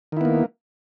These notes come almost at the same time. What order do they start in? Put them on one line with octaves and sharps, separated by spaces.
D#3 E4 B3 A#3